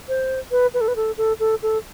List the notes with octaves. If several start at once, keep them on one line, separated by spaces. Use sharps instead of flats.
C5
B4
B4
A4
B4
A4
A4
A4
A4